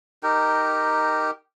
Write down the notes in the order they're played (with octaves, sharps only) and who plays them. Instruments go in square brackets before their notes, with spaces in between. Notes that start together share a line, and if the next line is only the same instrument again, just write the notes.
[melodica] D#4 G4 A#4 G5